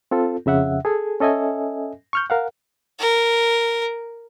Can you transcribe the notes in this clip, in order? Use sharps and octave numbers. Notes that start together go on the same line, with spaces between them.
C4 F4 A4
F2 C#3 E5 F#5
G#4 A4 G#5
C#4 A4 D#5 E5 G#5
C#6 F6 G6
A#4 F5 F#5
A#4